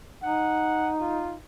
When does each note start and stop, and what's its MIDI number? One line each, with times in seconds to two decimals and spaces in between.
0.23 1.41 63
0.23 0.92 78
1.00 1.35 65